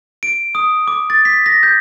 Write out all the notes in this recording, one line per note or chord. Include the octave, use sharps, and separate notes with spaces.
D7
D#6
D6
A6
B6
A#6
G6